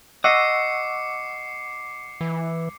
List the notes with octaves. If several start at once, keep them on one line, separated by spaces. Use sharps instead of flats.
D#5 F#5 C#6 D6 E6 C7 C#7
E3